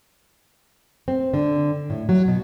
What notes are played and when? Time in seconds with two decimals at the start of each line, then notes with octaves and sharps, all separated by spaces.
1.08 C4
1.34 D3
1.90 A2
2.09 F#3
2.28 B2